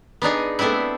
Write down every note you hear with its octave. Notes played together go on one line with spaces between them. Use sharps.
B3 D4 D#4 G#4
A3 B3 C4 D4 E4